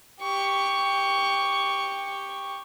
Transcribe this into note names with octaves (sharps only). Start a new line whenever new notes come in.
G4 C#6